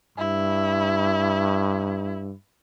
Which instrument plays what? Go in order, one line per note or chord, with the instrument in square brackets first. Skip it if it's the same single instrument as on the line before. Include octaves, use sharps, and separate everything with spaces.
[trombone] G2 [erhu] E4